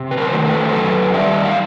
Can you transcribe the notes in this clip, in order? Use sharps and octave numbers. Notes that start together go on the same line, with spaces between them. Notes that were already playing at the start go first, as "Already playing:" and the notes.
Already playing: C3
B4
A#4 C5
D#3 F#3 A3
A4 B4
C5
F#2 A4 B4
D#3 G3 D5 E5
F5